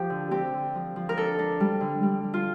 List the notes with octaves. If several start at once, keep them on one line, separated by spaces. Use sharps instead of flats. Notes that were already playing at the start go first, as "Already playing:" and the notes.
Already playing: F3 G4
D3
C4 G4
D3
F3
F3
A#4
D4 A4
D4
G3
D3
G3
G3
F4